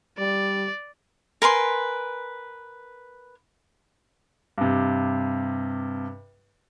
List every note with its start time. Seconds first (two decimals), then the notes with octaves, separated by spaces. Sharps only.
0.19 G3 D5
1.42 A#4 B4 G#5 C6
4.58 G2 C3